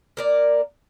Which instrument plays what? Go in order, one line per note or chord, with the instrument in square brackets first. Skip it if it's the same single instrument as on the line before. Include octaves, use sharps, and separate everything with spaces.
[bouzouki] A#3 A#4 D5